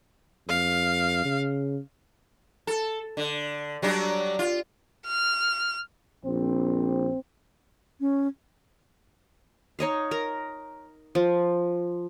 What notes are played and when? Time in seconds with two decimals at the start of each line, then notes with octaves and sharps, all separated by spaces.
0.49 F2 F5
1.25 C#3
2.67 A4
3.17 D3
3.82 F#3 G3 D4
4.39 F4
5.07 F6
6.25 A#1 C4
8.01 C#4
9.79 D#4 C#5 D#5 F5
10.11 A#4 A#5
11.15 F3